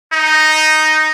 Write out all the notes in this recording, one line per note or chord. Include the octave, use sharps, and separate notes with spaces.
D#4